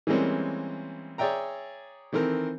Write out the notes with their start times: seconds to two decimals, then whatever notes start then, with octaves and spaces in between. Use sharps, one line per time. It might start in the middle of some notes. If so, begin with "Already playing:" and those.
0.07 E3 G3 G#3 A#3 C4 C#4
1.18 G#4 C#5 D5 E5 G5 A#5
2.12 D#3 E3 C4 A4 A#4